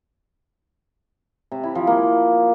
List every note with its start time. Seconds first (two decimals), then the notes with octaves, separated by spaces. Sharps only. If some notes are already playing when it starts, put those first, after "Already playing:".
1.52 C3
1.63 E4
1.75 F3
1.87 A#3